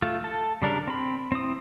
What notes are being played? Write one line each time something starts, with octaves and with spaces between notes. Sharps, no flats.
A3 F4
A4 A5
C#3 G3 D4 A#4
C4 B5
C4 E4 D#6